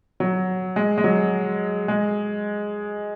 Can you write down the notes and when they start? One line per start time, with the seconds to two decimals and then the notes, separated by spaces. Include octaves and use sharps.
0.20 F#3
0.76 G#3
0.98 G#3
1.04 F#3
1.88 G#3